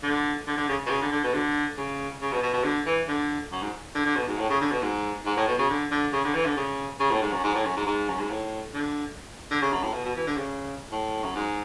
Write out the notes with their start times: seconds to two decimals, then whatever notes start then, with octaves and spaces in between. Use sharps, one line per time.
0.03 D3
0.47 D3
0.57 D3
0.68 C#3
0.86 B2
0.89 C#3
1.01 D3
1.11 D3
1.23 B2
1.34 D3
1.77 C#3
2.21 C#3
2.32 B2
2.42 B2
2.53 B2
2.64 D3
2.86 E3
3.08 D3
3.52 F#2
3.62 G#2
3.95 D3
4.05 D3
4.16 B2
4.27 G#2
4.38 A2
4.49 C#3
4.60 D3
4.71 B2
4.82 G#2
5.25 G#2
5.36 A2
5.47 B2
5.58 C#3
5.69 D3
5.91 D3
6.12 C#3
6.24 D3
6.34 E3
6.45 D3
6.56 C#3
7.00 C#3
7.10 A2
7.22 G#2
7.32 F#2
7.43 G#2
7.55 A2
7.65 F#2
7.76 G#2
7.86 G#2
8.09 F#2
8.19 G#2
8.30 A2
8.73 D3
9.51 D3
9.61 C#3
9.72 F#2
9.83 A2
9.93 B2
10.05 B2
10.16 E3
10.27 D3
10.37 C#3
10.91 A2
11.24 F#2
11.35 G#2